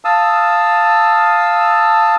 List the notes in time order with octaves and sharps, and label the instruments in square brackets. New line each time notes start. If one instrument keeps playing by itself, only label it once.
[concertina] F5 A5 D#6 E6